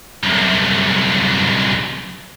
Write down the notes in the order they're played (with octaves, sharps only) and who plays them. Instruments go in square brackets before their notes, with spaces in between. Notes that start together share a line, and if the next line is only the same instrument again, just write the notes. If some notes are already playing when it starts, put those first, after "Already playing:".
[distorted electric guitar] C2 F#2